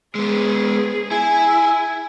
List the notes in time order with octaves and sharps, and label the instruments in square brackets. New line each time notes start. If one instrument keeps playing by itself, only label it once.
[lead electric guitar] G#3 B3 [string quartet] G#4
[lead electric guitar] E4 [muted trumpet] G#5